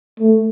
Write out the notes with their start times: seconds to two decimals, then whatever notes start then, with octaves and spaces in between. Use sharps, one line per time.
0.20 A3